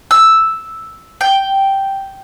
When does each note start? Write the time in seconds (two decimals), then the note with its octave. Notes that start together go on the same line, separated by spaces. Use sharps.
0.11 E6
1.21 G5